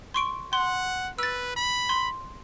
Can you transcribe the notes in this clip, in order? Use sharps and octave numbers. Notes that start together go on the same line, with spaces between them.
C6 C#6 D7
F#5 C6
B4 E6 A6
B5
C6